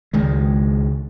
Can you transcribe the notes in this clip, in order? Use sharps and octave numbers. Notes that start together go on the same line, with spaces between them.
C#2 D#3 G#3